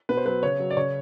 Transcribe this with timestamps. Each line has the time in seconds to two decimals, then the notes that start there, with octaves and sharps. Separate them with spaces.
0.09 B2 B4
0.17 C5
0.25 F#3 B4
0.43 C#3 C#5
0.59 F#3
0.70 D5
0.77 C#3 C#5